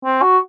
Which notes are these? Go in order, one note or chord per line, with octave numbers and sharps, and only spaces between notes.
C4
F#4